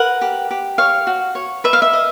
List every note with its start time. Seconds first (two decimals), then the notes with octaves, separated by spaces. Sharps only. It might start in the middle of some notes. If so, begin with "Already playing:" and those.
Already playing: A#4 B4 F#5
0.21 G4
0.51 G4
0.78 C#5 F5
1.07 F#4
1.35 C#5
1.64 B4 E5
1.73 F5
1.82 E5
1.93 D#5